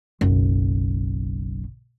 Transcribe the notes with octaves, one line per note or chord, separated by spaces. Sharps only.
F#1 B1